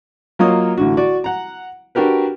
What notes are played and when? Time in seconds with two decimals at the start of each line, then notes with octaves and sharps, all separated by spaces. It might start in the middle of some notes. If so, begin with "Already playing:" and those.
0.39 F#3 A#3 F4 C#5 D#5 D#6
0.78 A1 D3 F#4
0.97 F#4 D5
1.24 F#5 A#5
1.95 D4 F#4 G4 A#4 B4